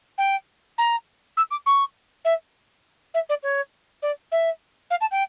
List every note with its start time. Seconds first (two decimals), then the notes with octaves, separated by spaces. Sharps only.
0.18 G5
0.78 A#5
1.37 E6
1.51 D6
1.66 C#6
2.25 E5
3.14 E5
3.29 D5
3.43 C#5
4.02 D5
4.32 E5
4.91 F5
5.01 A5
5.11 G5